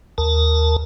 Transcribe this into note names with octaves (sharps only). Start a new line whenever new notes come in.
D#2 A#4 A5